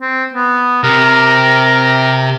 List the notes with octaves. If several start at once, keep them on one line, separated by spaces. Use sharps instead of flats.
C4
B3
C3 A#4